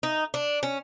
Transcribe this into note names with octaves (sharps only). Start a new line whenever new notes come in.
D#4
D4
C#4